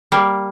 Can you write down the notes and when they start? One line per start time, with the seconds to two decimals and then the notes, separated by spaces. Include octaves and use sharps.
0.12 G3 A#3